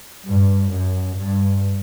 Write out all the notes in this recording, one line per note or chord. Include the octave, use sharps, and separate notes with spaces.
G2
F#2
G2